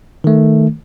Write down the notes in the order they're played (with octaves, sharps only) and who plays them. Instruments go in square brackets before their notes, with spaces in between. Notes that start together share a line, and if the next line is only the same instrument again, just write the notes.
[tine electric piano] D#3 A3